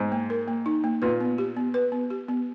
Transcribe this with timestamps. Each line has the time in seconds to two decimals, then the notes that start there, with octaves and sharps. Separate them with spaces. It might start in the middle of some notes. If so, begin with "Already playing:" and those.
Already playing: G#2
0.12 A#3
0.30 A#4
0.48 A#3
0.66 D#4
0.84 A#3
1.02 A#2 B4
1.20 B3
1.38 G4
1.56 B3
1.74 B4
1.92 B3
2.10 G4
2.29 B3